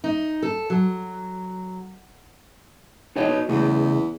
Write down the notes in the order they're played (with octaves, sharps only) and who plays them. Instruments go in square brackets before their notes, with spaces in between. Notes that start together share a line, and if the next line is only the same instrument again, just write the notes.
[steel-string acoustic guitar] D#4
A4
F#3
[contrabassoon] E1 [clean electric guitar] D#4 C#5 D#5
[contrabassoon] B2
[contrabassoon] E2 [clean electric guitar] C#3 A3